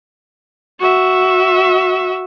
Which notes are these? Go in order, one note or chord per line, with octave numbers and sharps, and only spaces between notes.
F#4 E5